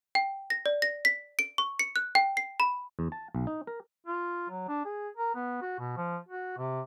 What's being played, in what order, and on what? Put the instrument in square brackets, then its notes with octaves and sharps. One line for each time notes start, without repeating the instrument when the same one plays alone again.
[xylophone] G5
A#6
D5
A#6
B6
D7
C#6
C#7
F#6
G5
C7
B5
[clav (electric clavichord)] E2
A5
B1
D#4
A#4
[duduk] F4
F#3
D4
G#4
A#4
B3
F#4
B2
F3
F#4
C3